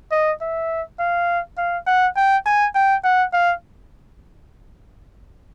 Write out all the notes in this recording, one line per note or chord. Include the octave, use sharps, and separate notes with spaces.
D#5
E5
F5
F5
F#5
G5
G#5
G5
F#5
F5